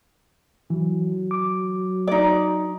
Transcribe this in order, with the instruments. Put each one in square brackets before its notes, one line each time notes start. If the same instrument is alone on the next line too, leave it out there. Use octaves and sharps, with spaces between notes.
[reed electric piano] E3 [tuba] F#3
[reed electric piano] D6
[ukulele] D#4 D5